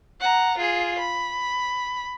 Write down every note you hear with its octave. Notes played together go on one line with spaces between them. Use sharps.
F#5 A#5
F4 G#4
B5